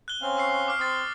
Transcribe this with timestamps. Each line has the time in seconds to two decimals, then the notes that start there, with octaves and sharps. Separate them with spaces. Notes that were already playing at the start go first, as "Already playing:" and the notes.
0.08 F#6 G7
0.22 C4 C#4 F5
0.37 C#6 E6 C7
0.68 D6 F6 C7
0.79 C4 C5 D#6 A6